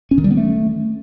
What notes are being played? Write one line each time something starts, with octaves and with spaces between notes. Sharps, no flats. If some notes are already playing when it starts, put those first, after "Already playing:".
C#4
D#3
G3
B3
A3